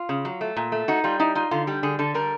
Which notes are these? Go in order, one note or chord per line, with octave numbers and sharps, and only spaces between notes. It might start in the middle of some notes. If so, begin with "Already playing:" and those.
Already playing: F4
C#3
F#3
A3
A#2
A3
D#4 F#4
G3 F4
D#4 E4
D#4 F4
D3 F4
G3 G4
D3 G#4
D3 A4
G3 A#4